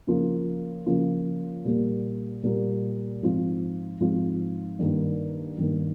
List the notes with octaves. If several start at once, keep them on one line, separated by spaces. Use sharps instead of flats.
C#3 F3 A#3 F4
C#3 F3 A#3 F4
A#2 G3 A#3
A#2 G3 A#3
G#2 F3 C4 F4
G#2 F3 C4 F4
G2 D#3 A#3
G2 D#3 A#3